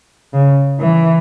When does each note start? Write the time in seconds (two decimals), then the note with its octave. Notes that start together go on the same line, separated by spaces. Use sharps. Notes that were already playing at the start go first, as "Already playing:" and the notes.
0.33 C#3
0.80 E3